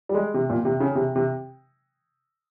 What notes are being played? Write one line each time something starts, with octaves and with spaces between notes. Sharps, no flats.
G3
G#3
C3
A#2
C3
C#3
C3
C3